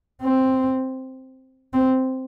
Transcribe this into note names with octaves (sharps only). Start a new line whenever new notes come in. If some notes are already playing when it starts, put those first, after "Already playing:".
C4
C4